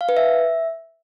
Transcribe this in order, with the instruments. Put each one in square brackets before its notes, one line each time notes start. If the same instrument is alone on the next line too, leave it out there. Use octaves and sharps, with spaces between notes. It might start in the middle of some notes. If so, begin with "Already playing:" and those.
[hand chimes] F5
B4
E5